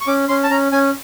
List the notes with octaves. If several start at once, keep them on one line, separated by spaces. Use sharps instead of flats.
C#6
C#4 D6
C#4 C6
A5
C#4 A#5
C#4 G#5